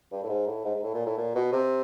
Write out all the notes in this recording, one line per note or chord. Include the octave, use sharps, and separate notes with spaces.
G2
A2
G#2
A2
G#2
G#2
A2
A#2
A2
A#2
B2
C3